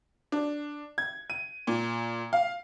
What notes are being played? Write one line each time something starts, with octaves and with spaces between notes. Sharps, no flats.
D4
G#6
D#7
A#2
F5